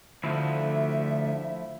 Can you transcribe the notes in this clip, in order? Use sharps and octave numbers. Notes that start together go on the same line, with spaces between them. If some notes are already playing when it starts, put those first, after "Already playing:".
D2 F3 A3 E4 E5